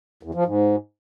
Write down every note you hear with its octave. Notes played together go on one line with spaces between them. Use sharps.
E2
F3
G#2